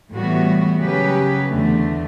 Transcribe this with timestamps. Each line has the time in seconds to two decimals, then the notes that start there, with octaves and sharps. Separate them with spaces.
0.13 A2 E3 G3 B3 F#4
0.81 C#3 F#3 C#4 G4 B4
1.50 E2 D3 A3